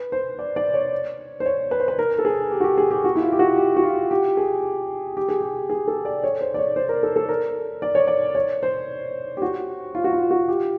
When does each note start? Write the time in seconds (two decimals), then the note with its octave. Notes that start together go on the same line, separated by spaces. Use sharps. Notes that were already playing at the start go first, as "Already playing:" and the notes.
Already playing: B4
0.12 C5
0.39 D5
0.56 D5
0.74 C#5
1.40 C5
1.46 C#5
1.71 B4
1.80 C5
1.88 B4
1.99 A#4
2.19 A4
2.25 G#4
2.51 G4
2.60 F#4
2.64 G4
2.78 G#4
2.91 G4
3.04 F#4
3.15 E4
3.22 F4
3.32 G4
3.39 F#4
3.57 G4
3.76 F#4
3.83 F4
4.11 G4
4.37 G#4
5.17 G4
5.28 G#4
5.41 G4
5.69 G#4
5.88 A4
6.05 D5
6.24 C#5
6.41 C5
6.54 D5
6.59 C#5
6.76 C5
6.89 A#4
7.03 A4
7.16 A4
7.29 A#4
7.82 D5
7.95 C#5
8.08 D5
8.35 C#5
8.63 C5
9.37 G4
9.42 F#4
9.95 F4
10.04 F#4
10.13 F4
10.31 F#4
10.48 G4